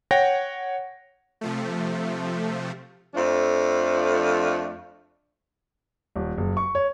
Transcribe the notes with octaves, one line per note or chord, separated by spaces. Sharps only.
C#5 F#5 G5 A#6
C3 F3 A3
F2 F3 A3 D4
D#1
F#1
C#6
C#5